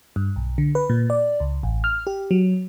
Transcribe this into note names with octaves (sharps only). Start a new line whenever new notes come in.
G2
B1
D3
B4
A#2
D5
C#2
A1
F6
G4
F#3